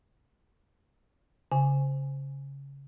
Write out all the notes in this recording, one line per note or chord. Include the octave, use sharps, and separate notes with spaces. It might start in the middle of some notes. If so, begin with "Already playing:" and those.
C#3 G#5